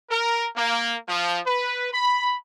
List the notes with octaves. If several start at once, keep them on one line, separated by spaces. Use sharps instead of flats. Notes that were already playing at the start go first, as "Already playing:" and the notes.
A#4
A#3
F3
B4
B5